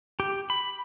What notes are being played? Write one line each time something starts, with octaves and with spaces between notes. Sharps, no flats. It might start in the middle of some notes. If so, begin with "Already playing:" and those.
G4
B5